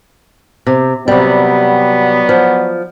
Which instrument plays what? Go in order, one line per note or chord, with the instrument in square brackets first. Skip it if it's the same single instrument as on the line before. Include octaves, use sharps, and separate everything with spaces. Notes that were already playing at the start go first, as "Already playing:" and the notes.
[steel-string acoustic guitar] C3
[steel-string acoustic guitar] C3 G3 [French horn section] F#3 B3 D5
[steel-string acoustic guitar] F3